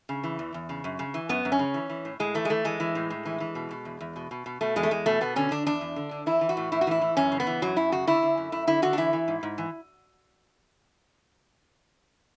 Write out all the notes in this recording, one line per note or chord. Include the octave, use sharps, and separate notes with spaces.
C#3
E3
E2
E2
C#3
F#2
C#3
E3
F#2 B3
F#2
C#4
C#3
E3
E3
A2
A2 G#3
E3 A3
G#3
E3 A3
E3 G#3
E3
A2
A2
E3
E3
B2
B2
E2
E2
B2
B2
B2
B2 A3
E2 G#3
A3
E2 G#3
B2 A3
B2 B3
D3 C#4
D3 D4
E2 D4
E2
D3
D3
E3 E4
E3
F#4
A2
A2 E4
F#4
E3 E4
E3
F#2 C#4
C#3
B3
E3
F#2 F#3
F#2 E4
C#3 F#4
D3 E4
D3
F#2
F#2 E4
D3 E4
D3 F#4
D4
E3 E4
E3
G#2
G#2
E3